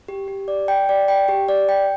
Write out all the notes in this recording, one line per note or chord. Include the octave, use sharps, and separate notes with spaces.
G4
G4
D5
G5
D5
G5
G4
D5
G5